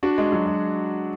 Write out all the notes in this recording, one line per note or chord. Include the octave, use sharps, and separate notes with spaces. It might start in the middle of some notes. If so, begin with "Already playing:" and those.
D4 F#4
G#3
F#3
G#3